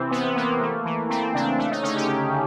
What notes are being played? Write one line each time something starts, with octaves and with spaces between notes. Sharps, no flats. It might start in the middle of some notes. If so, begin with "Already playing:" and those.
Already playing: C3 E3 C4
C3 B3
E3 A#3
A3
E3
A3 C4
C#3 D4
A3 D4
D#4
D3 C#4
G4
D3